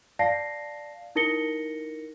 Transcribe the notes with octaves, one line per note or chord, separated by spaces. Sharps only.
D5 F5 A5 A#6 C7
D#4 E4 A#4 A#6 C#7 G7